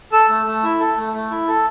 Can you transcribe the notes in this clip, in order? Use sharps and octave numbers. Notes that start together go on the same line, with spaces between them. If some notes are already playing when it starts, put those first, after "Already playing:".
A4 E6
A3
A3
E4
A4
A3
A3
E4
A4